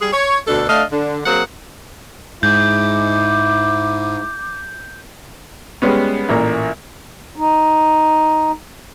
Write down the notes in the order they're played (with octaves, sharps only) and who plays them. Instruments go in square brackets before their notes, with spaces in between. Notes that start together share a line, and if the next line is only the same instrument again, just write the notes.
[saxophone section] G3 G#4
C#5
D2 B2 D4 A4
A3 D4 D#5 F5
D3
F#3 A#3 C4 G#4 F#5
[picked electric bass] G#2 [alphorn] E4 [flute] D6 [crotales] G6
[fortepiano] G3 G#3 B3 C#4
A1 A#2 A#3
[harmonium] D#4